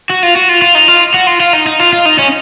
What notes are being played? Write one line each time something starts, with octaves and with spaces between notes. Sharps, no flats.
F#4
F4
F#4
F4
F4
D#4
F4
F#4
F4
F4
D#4
D#4
F4
F4
D#4
C#4